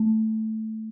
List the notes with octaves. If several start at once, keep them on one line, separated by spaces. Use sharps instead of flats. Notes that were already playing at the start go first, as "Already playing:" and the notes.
Already playing: A3